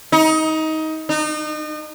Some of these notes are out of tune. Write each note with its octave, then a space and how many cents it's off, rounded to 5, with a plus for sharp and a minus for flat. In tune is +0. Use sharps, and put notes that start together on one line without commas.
D#4 +20
D#4 -35